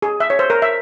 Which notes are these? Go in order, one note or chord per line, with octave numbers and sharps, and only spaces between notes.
G#4
E5
C#5
C5
A#4
E5